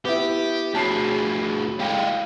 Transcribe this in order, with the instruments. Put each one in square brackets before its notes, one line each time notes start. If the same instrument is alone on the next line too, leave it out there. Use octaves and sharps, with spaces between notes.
[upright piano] B3 E4 [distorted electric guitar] G4
[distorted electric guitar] D2 G#4 [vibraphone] F#4 C#5 B5 [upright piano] A5 C7
[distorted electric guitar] G#3 G4 [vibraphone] E4 A4 F5